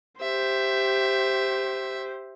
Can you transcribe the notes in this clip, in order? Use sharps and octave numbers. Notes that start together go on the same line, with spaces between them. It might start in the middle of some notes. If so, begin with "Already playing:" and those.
G4 C5 E5